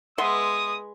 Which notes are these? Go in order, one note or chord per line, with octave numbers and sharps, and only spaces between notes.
G#3 B3 B4 E5 C6 D#6